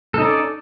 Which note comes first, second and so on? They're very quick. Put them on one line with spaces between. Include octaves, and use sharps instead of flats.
A4 D#4 C#4 D5